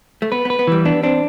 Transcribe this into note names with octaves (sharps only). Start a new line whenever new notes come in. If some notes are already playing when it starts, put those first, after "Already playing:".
A3
B3 B4
B3
B4
B3
E3 G3
B3 D4
C4 D4